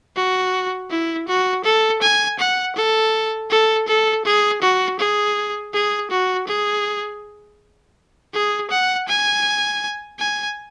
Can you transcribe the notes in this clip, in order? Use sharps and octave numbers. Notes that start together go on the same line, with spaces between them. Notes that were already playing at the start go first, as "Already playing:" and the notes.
F#4
E4
F#4
A4
G#5
F#5
A4
A4
A4
G#4
F#4
G#4
G#4
F#4
G#4
G#4
F#5
G#5
G#5